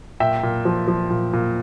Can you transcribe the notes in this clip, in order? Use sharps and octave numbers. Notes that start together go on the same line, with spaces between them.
A#2 E5 G5
A#2
F3
F3
A#2
A#2